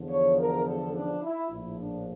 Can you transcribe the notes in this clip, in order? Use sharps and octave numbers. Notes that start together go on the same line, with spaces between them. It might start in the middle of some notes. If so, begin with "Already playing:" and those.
Already playing: E2 D3 F3
C#5
A#4
A4
D4
E4
A#1 A2 F3 E4
D4